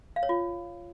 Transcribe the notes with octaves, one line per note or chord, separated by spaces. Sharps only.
F5
C#5
F4